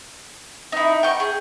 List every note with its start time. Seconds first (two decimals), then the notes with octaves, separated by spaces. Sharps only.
0.72 D#4 E4
1.03 G5 C#6
1.20 G#4